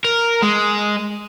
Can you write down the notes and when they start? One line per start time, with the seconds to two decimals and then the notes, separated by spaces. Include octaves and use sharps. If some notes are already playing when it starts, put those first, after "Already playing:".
0.05 A#4
0.43 G#3